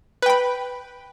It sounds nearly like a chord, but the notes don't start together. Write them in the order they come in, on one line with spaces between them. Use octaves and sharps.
B4 G5 B5